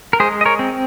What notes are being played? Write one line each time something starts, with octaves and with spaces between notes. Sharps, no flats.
A#4
G#3 G#4 C5
D#5
A#4 C#5
C4